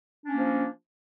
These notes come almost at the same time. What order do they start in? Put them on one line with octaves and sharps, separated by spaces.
D4 C#4 A#3 F3